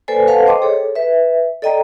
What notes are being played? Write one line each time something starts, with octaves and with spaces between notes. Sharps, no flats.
A#3 A4 B4 C5 D5 G#5
A4 B4 C5 F5 F#5 A5
C5 D#5 G5 C6 D6
G#4 A4 C#5
B4 E5
A4 D5 D#5 G5 A#5